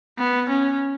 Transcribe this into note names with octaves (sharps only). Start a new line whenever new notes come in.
B3
C#4